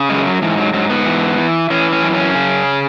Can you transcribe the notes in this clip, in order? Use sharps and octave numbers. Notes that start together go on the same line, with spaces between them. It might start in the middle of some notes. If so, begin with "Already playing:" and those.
Already playing: C#3
F#2 G#3
F#3
G#2 E3
F#3
G#2 F#3
B3
E3
E3
E3 C#4
C#4
F#2
C#4
C#3